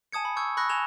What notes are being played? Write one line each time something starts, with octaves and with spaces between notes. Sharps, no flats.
G#5 A5 D#6 G#6 C#7
B5
C#6 E6 G6 G#6
B5 C#6 E6 F#6 A#6
G#5 G#6 E7 F7 G7